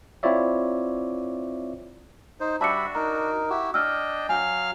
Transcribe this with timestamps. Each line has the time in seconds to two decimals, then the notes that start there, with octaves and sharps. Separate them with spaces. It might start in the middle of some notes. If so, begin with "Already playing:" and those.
0.23 C4 E4 F4 C#5 D5 E5
2.40 D#4 C5
2.61 G3 D4 F#4 E5 A5 B5 D6 C#7
2.95 D#4 A#4 A#5
3.50 E4 F#4 G4
3.74 D4 D#5 G5 E6 F6
4.29 F#3 F5 G#5 F6